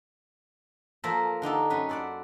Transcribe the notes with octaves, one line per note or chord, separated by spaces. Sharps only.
F3 A#3 A4 A#4 C5 E5
D3 D#4 G4 A4
F#2 C#4 B4
A4 C5 D5 E5 F#5